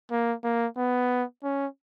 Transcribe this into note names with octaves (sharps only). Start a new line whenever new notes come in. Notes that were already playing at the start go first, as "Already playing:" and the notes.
A#3
A#3
B3
C#4